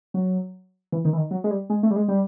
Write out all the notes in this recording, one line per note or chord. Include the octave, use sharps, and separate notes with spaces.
F#3
E3
D#3
E3
D#3
F#3
G#3
G3
G#3
A3
G3
G#3
G3